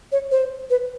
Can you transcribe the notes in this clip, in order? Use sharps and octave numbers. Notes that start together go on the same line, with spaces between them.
C#5
C5
B4